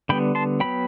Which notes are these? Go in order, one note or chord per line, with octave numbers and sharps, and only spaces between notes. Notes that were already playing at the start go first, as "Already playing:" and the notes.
D3 G3 B3 G5 B5
A5 C6
F#3 B3 G5 B5